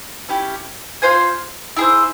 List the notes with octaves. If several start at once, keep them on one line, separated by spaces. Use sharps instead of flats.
C#4 E4 G4
F4 C5 F5 G#5
E4 G#4 C5